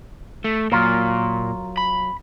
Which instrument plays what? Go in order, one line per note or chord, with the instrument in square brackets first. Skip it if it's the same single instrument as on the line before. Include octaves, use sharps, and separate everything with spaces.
[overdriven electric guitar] A3
[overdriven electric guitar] A#2 [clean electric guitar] F#3 F4 A#4
[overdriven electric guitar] B5